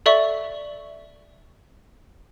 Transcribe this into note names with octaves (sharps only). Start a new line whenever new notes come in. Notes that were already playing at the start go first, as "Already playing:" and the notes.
A4 D5 E5 C#6